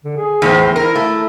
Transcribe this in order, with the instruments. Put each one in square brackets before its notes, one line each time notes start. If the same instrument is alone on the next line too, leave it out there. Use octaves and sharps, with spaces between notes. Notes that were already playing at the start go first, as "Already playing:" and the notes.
[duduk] D3
G#4
[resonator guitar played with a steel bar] E2 A2 C4
[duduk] E4 [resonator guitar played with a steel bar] A#4
[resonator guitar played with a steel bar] A3